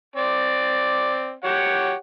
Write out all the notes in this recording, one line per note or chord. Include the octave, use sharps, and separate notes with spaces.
C4 D5
G4 C#5 F#5